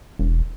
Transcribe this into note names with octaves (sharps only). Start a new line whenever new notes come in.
E1